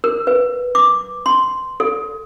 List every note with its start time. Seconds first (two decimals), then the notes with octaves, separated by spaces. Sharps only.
0.04 A#4
0.27 B4
0.75 D6
1.26 C6
1.80 A4